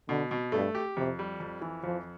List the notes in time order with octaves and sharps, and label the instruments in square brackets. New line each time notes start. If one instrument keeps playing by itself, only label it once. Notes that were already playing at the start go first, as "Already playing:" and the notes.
[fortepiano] B2 [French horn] D3
[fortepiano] B2
[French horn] G2 [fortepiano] A3
[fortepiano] G4
[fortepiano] F2 [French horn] C3
[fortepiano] G3
F2
E3
[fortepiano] F2 [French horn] F3